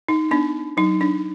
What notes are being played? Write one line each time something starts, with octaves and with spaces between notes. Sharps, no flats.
D#4
B3 D4
F#3 D#4
D4